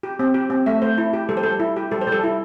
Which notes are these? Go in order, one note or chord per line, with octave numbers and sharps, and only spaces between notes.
G4
C4
G4
C4
A3 E5
A3 C5
E4
G4
G3 A4
C5
G3 A4
E4
G4
G3 A4
C5
G3 A4
E4